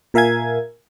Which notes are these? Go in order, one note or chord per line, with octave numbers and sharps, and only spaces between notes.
A#2 A#4 E5 F5 G#5 G#6